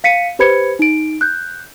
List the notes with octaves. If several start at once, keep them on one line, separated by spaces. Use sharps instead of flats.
F5 B6 C#7 D#7
G4 B4 C5 B5 G#6 C#7
D#4 D7
F#6 G6